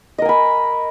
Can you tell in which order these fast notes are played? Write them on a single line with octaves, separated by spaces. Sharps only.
D#5 A#4 G#5 B5